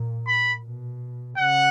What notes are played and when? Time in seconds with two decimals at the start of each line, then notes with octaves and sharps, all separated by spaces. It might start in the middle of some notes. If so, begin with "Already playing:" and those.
Already playing: A#2
0.27 B5
0.65 B2
1.37 C#3 F#5